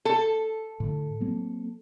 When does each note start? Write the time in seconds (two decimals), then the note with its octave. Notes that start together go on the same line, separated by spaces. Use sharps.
0.05 A4
0.80 A2 D3
1.20 F#3 A#3 C4